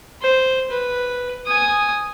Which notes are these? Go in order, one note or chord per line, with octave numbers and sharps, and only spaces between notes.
C5
B4
G#5 D#6